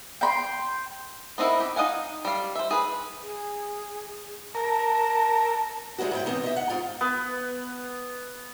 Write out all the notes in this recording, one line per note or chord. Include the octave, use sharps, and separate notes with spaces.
G5 B5 C6
B3 C4 D#4 E4 A#4
G4
D#4 D#5 F5 F#5 G#5
G3 F5
C5 E5
G#4 B4
G#4
A#4 A5
G3 G#3 D4 E4 F#4
G#2 E4 G5
E3 B3 C4 D#4
D#5 E5
F#5
G#2 C4 F4
B3